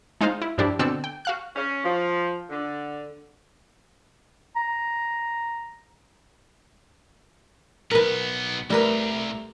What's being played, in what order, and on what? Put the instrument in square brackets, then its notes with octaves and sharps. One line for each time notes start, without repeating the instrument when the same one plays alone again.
[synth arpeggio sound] G#3 D#4 F4 C5 F5
E4
G2 F3 D4 E4 G4
B2 D3 C4 D5 E6 C#7
G5
F#4 F5 F#6
[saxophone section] C#4
F3
D3
[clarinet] A#5
[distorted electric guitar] B1 B3 [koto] A#4 B4
[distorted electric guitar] C2 [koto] G3 A#4 B4 [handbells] A3 A#5